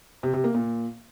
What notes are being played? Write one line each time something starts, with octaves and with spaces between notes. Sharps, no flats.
C3
C3
A#3
A#2